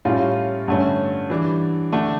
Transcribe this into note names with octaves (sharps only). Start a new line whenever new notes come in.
A2 G3 C#4 F4
G2 D3 A3 C#4
E3 G3 D4
D3 A3 D4